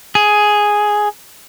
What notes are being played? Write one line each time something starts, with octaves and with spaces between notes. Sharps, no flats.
G#4